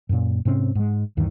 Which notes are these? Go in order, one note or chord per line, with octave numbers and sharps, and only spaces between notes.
F#2 A#2
G#2 C3 C4 C#4
G#2 G#3
D2 G2 D#3 E3